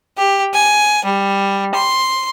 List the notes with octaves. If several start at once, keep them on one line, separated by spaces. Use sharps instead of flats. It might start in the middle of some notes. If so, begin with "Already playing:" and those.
G4
G#5
G3
C6